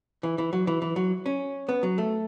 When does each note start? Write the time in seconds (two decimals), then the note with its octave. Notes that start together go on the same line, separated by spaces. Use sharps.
0.23 E3
0.38 E3
0.53 F#3
0.67 E3
0.82 E3
0.96 F#3
1.26 C#4
1.69 B3
1.83 F#3
1.98 A3